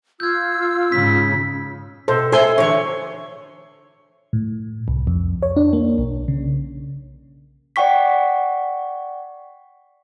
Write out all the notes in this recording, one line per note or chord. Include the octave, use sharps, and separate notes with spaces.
F4 E6 G6 G#6
G#2 C#3 B6
B2 A4 C5
A4 C5 E5 G#5 C6
D3 E3 C#5 C#6
A2
C2
F2
C#5
D4
A#3
B1
C#3
D5 F#5 G5 C#6 B6